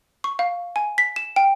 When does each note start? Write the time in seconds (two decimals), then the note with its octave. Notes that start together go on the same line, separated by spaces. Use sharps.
0.24 C#6
0.39 F5
0.76 G#5
0.98 B6
1.16 E7
1.36 G5